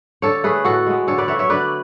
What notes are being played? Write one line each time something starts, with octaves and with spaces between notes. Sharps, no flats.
D3 A4 C#5
A3 G#4 B4
A2 F#4 A4
G#3 B3
D3 A4 C#5
B4 D5
F#3 A3 C#5 E5
C#5 E5
D3 B4 D5